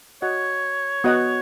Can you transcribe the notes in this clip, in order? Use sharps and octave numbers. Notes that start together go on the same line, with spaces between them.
F#4 C#5 D#5 F#5
B3 F#4 D#5 F#5